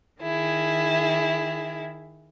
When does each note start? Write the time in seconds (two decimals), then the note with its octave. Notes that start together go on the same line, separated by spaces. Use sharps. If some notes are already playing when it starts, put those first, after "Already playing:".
0.20 D#3 E4 G#4